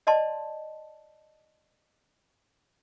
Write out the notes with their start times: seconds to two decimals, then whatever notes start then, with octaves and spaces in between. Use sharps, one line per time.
0.07 D5 D#5 A5 C6